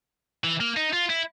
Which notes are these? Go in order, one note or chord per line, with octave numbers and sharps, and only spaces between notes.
E3
A#3
D#4
F4
E4